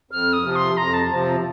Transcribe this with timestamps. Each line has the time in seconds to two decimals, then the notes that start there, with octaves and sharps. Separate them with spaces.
0.11 F2 F6
0.33 D#6
0.44 C3 F3
0.56 C6
0.77 F2 A#5
0.94 A5
1.10 C3 F3 A5